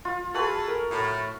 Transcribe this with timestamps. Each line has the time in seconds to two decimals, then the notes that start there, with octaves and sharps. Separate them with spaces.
0.05 F4
0.34 F#4 G#4 A4 B4
0.67 A#4
0.90 A2